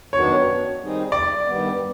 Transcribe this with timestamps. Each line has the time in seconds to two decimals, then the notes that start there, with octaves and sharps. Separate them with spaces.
0.13 F#2 D#3 F#3 B3 D4 C#5
0.79 D#3 G3 C4 D#4 G#4
1.12 D5
1.46 G2 D#3 G3 B3